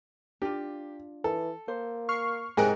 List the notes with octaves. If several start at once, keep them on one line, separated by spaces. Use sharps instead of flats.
D4 F4 G4
E3 A4
A#3 C5
C#6 F6 C7
G#2 C3 G#4 A#4 D#5 G5 G#5 F#6